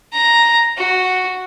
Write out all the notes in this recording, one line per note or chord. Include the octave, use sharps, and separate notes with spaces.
A#5
F#4